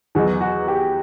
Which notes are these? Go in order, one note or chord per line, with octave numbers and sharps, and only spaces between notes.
E2 B2 F#3 F#4
F#4
G4